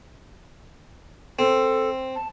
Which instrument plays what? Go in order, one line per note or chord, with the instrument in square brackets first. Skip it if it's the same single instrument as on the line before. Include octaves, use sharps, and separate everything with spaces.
[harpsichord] C4 [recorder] A4
[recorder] A5